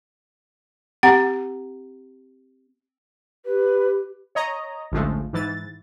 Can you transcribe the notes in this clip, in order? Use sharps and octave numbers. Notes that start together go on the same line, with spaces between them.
C4 G4 F#5 A#5
G4 B4
C#5 D#5 A#5
A1 D2 F3 G#3 A3
G#2 E3 A6